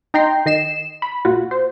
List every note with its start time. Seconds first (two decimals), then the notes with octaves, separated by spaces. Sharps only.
0.14 D#4 G5 A#5 C6
0.46 D#3 D#5 C7 E7
1.02 B5
1.25 A#2 F4 F#4
1.51 C5